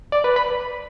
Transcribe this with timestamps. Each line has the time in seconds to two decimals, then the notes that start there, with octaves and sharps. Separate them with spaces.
0.12 D5
0.24 B4
0.36 B5